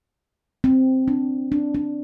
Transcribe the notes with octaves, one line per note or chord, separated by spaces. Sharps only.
C4
D4
D4
D4